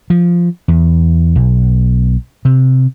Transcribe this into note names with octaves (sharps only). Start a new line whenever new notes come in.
F3
E2
B1
C3